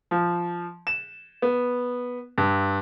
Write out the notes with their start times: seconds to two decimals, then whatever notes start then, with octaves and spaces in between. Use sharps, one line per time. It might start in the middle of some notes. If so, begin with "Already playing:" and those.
0.11 F3
0.87 E7
1.42 B3
2.38 G2